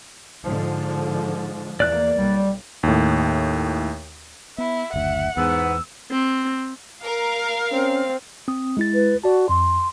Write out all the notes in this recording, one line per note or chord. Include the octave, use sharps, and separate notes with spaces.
G#2 D3 F3
E2 A#3 D5 F#6
B1 G3
D#2 A2
B3 E4
F#1 D2 E5 F#5
E2 G#2 B3 E6
C4
A#4 F5
C4 C#4
C4 D#6
G#3 E4 A6
B4
F#4 D5 A5
F2 C6